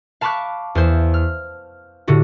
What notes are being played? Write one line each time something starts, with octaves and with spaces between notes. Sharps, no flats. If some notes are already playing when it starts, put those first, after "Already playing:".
F5 A5 B5 C#6 D6 F#6
E2 C5
F6
A2 D3 F#4 G4